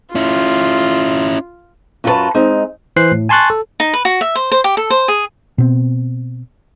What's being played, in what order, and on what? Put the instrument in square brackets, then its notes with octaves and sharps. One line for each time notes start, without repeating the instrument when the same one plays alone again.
[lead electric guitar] C#4 E4 [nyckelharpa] F4
[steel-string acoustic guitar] F#2 F4 F#4 A4 B4 A5
G#3 C4 D#4
[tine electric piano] E3 C5 F#6 C7
A2
G#5 A5 C6 C#6 F#6 A6
A4
[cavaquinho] D#4
B4
F#4
E5
C5
C5
G4
A4
C5
G#4
[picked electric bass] B2 C4